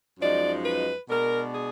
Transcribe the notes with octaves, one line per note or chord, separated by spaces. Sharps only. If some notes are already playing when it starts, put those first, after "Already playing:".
F#2 F3 G#3 D#4 D5
B4
B2 G#3 D4 A#4
G#4